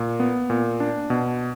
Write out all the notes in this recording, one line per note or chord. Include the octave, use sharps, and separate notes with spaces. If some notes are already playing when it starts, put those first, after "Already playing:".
Already playing: A#2
B3
A#2
D4
B2